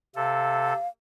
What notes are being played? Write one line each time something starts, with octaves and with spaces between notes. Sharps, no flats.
C3 A4 F5